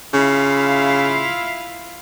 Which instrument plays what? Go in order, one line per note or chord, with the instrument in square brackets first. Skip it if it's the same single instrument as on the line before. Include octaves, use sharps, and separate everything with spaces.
[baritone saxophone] C#3 [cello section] E4 F4 F5